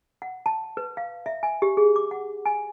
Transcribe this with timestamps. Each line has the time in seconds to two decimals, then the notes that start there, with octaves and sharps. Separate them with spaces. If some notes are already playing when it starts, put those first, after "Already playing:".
0.22 F#5
0.46 A5
0.77 B4
0.97 F5
1.26 E5
1.43 G#5
1.62 G4
1.77 G#4
1.96 D6
2.11 F#5
2.46 G#5